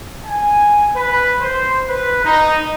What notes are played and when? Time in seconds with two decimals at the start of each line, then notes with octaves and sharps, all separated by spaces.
0.24 G#5
0.95 B4
1.40 C5
1.88 B4
2.24 D#4